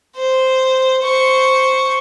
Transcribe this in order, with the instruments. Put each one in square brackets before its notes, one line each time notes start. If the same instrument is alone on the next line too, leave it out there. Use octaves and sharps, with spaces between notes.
[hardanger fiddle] C5
C5 C#6